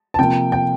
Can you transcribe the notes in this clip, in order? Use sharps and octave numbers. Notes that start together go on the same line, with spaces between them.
A5
C3 F3 A#3 G5
G5